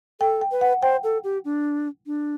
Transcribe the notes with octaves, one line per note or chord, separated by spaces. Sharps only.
A4 G5
G5
B4
F#5
C5 G5
A4
G4
D4
D4